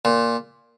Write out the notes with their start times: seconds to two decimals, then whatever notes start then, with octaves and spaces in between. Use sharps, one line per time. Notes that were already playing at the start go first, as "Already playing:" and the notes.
0.05 A#2